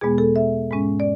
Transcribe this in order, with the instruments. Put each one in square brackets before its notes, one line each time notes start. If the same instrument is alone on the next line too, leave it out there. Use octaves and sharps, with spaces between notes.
[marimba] E2 B2 G#3 B3 G#4
A4
E5
G#2 G#3 C#4
D5